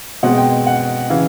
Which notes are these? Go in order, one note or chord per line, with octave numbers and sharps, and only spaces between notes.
B2 G#3 C4 F#5
G5
F#5
C#3 E3 F5